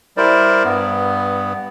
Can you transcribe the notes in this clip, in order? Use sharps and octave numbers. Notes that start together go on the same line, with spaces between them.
G3 E4 A#4 C5 D5
G2 B3